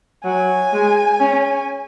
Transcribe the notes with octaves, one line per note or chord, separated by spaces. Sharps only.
F#3 G#5
G#3
C#4